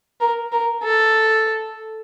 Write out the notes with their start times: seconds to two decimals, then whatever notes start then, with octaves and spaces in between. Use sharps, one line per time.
0.20 A#4
0.52 A#4
0.83 A4